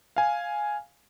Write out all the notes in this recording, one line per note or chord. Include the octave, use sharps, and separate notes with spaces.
F5 G#5